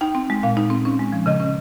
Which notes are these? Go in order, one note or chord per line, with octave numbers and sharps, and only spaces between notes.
D#4 G5
C4
G#3
A#2 F5
D#4
C4
C#4
G#3
F3
C#3 D#5
C#4